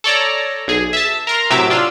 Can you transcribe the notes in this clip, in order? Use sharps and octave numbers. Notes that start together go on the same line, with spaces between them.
A4 C#5 D5 A#5
B1 G#4
E5 A5
A#4 A#5 C6
A2 C3 F#3 E5 D6 E6
D4 F4 E6